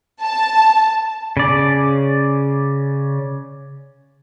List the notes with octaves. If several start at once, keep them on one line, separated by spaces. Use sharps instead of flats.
A5
C#3 D5